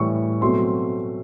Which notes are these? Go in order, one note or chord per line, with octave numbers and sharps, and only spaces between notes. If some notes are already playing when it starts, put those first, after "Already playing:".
Already playing: A2 E3 G3 C#6
B2 F#3 A3 C4 C6